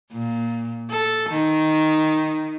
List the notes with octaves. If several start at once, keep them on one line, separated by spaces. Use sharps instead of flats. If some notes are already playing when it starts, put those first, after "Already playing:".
A#2
A4
D#3